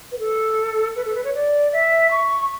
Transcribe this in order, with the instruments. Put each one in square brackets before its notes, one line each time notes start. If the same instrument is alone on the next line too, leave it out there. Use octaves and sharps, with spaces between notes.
[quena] B4
A4
B4
A4
B4
C#5
D5
E5
C#6